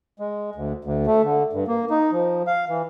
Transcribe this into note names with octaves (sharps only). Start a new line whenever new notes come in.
G#3
D2
D2
A3
D3
G2
A#3
D#4
F3
F5
E3